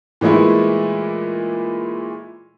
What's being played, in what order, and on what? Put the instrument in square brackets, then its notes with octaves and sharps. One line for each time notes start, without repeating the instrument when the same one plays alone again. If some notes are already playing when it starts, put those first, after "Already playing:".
[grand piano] A#2 E3 G#3 A3 E4